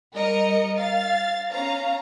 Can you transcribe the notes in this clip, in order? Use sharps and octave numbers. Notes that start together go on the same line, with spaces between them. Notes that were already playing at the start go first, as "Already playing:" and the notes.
G3 A#4 D#5 C#7
F5 A6
C#4 F5 A#5